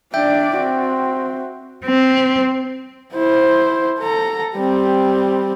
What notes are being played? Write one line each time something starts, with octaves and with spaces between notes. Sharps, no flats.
D4 D5 E5 G5 G6
C4 F#4
C4
E4 C5
A4 A#5
G3 C4